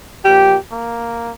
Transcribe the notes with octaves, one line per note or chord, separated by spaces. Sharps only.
A#2 F3 G4
A#3